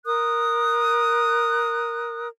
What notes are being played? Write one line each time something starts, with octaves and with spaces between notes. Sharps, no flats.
A#4 D#6 F#6